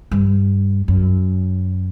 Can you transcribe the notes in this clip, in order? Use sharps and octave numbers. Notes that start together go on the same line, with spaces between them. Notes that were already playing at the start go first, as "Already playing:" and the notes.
G2
F#2